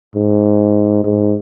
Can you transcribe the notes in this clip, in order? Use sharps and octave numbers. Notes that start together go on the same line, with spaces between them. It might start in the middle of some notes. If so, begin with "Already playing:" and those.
G#2
G#2